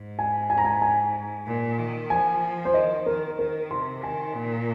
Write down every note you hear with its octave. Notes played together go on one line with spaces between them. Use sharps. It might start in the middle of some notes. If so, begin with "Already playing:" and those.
Already playing: G#2
G#5
G#5
A#5
G#5
G#5
A#2
D#3
F3 G#5
C5
D#3 D#5
D#3 A#4
D#3 A#4
C3 C6
D#3 G#5
A#2